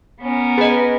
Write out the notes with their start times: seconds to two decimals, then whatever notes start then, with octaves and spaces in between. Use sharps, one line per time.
0.21 B3 C#4 A#4
0.58 G#4 B4 D#5